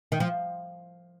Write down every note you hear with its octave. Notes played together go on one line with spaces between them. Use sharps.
D#3
F3